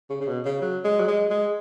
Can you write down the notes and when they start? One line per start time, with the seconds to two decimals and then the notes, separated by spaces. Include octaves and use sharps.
0.10 C#3
0.21 C#3
0.28 B2
0.45 C#3
0.61 F#3
0.84 G#3
1.00 F#3
1.08 G#3
1.30 G#3